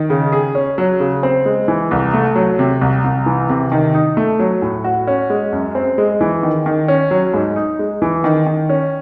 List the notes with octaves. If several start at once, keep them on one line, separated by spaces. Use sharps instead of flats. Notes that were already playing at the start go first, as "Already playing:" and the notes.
Already playing: D#3
C#3
G#4
C#4
F#3
C#3
C4
G#3
E3
C2
A3
F#3
C3
C2
C2
E3
C3
D#3
D#4
A3
F#3
A2
F#4
C#4
G#3
F#2
C4
G#3
E3
D#3
D#3
C#4
F#3
G#2
D#4
G#3
E3
D#3
D#3
C#4